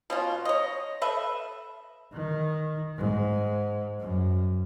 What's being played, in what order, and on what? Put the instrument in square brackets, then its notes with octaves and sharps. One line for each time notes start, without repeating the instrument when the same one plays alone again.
[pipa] B2 C#4 F4
C#5 D#5
A4 B4 E5
[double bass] D#3
G#2
F#2